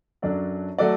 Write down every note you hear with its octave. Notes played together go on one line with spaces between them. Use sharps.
F#2 F#3 D4 A4 D5
F#3 A3 F#4 A4 D5